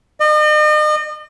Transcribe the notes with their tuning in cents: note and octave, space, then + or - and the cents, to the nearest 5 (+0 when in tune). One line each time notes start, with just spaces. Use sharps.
D#5 -40